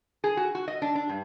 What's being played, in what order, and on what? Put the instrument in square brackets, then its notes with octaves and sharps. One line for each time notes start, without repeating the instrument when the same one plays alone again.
[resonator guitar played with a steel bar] G#4
F#4
F#4
D#5
D4
D4
G2